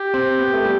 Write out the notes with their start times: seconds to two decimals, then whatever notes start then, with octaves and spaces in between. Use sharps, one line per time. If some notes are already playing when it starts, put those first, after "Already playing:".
Already playing: G4
0.14 C4
0.39 B3
0.54 A3
0.64 G3